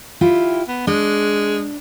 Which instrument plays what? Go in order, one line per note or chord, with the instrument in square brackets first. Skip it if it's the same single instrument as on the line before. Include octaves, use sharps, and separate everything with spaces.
[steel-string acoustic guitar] E4 F4 G4
[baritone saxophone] B3
[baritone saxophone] G#3 [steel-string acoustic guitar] D4